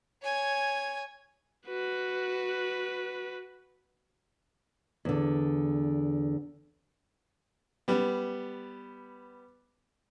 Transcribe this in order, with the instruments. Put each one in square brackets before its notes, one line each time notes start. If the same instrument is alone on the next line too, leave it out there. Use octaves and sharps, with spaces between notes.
[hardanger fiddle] C#5 G#5
[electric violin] F#4 B4
[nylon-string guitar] E2 D3
[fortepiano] G3 B3